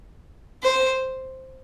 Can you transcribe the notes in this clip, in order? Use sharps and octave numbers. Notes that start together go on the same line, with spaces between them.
C5